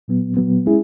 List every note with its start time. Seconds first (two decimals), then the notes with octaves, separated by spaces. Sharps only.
0.08 A#2 F#3 B3
0.37 A#2 F#3 B3
0.66 G#3 C#4 E4 G#4